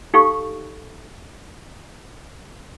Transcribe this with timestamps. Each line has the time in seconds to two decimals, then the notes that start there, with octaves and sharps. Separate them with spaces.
0.14 D#4 G4 A4 F5 G5 C#6